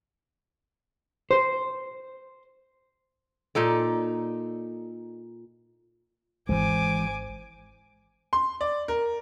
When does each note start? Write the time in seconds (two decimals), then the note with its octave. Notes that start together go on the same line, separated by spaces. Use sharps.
1.31 C5
3.55 A#2 D#4 A4 D5
6.49 G#1 E3 G#3 C5 G#5 D6
8.33 C6
8.61 D5
8.88 A#4